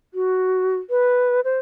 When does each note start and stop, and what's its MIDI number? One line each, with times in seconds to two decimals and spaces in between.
0.14 0.76 66
0.90 1.41 71
1.45 1.59 72